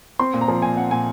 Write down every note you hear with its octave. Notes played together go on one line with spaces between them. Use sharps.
C4 C6
A#2
A#5
F3
A#2 G#5
C4 F#5
A#2 G#5